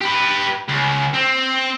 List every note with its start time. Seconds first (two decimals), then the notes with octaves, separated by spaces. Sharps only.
0.02 G4 B4
0.69 C#2
1.14 C4